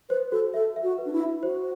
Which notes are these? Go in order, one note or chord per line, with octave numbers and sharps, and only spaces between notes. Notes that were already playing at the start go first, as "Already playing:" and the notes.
B4 C5
F#4 A4
A4 E5
E5
F#4
B4
D4
E4
E5
F#4 C5